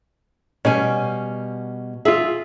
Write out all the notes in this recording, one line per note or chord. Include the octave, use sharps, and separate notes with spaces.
B2 G3 C#4 G#5
F4 G#4 E5